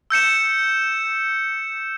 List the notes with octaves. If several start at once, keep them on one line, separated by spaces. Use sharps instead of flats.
E6 G6 C#7 E7